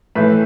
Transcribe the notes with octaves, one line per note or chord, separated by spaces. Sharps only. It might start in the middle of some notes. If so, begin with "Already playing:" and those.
A2 E3 A3 B4 E5